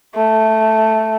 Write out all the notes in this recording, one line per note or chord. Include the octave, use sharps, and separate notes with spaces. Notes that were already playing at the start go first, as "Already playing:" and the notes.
A3